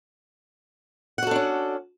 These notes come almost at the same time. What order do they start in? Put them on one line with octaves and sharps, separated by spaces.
F#5 F#4 A4 D4 C#4